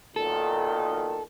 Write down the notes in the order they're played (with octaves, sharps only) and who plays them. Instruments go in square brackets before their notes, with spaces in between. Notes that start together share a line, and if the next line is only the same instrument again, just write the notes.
[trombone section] B1 A#2 D#3 [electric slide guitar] A4